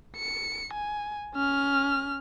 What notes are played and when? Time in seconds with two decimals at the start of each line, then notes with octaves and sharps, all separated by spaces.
0.16 C#7
0.74 G#5
1.35 C#4 F6